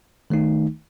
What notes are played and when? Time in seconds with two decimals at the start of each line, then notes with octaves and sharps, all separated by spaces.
0.30 D#3 A3 D#4